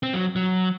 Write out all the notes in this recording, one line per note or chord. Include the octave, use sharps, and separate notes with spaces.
C4
F#3
F#3